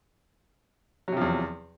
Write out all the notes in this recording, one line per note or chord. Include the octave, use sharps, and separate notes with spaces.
E2 C3 F3 F#3